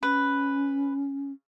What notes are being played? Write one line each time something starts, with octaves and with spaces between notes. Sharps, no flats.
C#4 B4